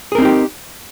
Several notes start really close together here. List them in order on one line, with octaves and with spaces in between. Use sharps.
G#4 A#4 C4 D#4 G4